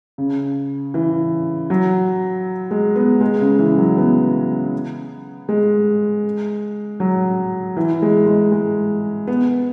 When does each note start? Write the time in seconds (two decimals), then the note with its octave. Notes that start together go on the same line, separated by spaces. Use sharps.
0.18 C#3
0.94 E3
1.70 F#3
2.71 G#3
2.96 B3
3.21 G#3
3.41 C#3
3.59 E3
3.78 F#3
3.98 B3
5.49 G#3
7.00 F#3
7.77 E3
8.02 G#3
8.26 G#3
8.52 G#3
9.28 B3